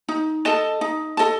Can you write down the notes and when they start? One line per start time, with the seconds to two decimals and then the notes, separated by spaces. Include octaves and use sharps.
0.09 D#4
0.45 A4 D#5 A5
0.81 D#4
1.17 A4 D#5 A5